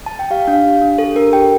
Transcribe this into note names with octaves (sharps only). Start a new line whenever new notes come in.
A5
G5
G4 F5
D4
F5
G4
D4
G4 A4
D4 A#4
G4 G5